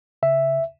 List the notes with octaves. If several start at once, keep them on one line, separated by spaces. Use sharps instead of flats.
C#3 E5